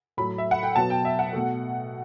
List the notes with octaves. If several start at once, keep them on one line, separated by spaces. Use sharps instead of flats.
A2 F#3 A3 B5
E5
F#5
G5
B2 F#3 B3 A5
G5
E5
F#5
B2 A3